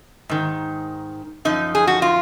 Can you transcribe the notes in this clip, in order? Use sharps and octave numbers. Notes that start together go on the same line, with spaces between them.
G#2 D#3
F#2 F3 D#4
G#4
F#4
F4